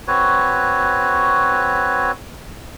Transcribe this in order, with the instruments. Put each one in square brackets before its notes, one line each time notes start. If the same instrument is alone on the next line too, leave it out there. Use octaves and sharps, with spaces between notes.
[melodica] C4 F#4 B4 C#5